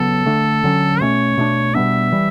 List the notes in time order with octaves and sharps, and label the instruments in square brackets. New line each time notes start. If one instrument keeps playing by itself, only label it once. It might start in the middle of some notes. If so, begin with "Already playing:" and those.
Already playing: [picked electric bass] C#3 F#3 B3 [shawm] A4
[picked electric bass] D3 A3 D4
D3 F#3 C#4
[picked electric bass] B2 A3 C#4 [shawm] C#5
[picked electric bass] B2 A3 D4
[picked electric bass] B2 G3 B3 D4 [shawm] E5
[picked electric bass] E3 G3